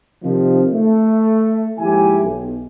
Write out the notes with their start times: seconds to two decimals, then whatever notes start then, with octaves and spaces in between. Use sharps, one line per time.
0.24 C3 D#3 F3
0.73 A3
1.79 D#2 G#2 F3 E4 G4 G#5
2.23 B1